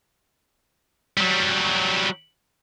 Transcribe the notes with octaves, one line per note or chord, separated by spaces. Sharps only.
F#3 G3